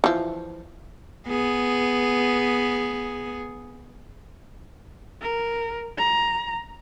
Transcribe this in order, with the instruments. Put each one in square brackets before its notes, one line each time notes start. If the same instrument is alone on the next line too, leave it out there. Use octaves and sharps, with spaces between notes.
[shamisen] E3 F3
[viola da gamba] B3 G#4
[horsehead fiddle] A#4
A#5